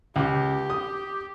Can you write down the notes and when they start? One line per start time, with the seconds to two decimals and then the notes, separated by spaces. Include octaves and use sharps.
0.16 C#2 G4
0.70 D#6